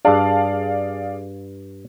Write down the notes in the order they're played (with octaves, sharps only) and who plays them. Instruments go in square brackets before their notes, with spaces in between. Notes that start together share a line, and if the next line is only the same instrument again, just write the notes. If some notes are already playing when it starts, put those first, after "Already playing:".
[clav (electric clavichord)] G2 D4 [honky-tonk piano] G#4 D5 F5